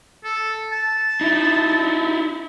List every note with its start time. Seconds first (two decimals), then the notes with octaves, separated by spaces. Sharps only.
0.24 A4
0.72 A5
1.21 D#4 E4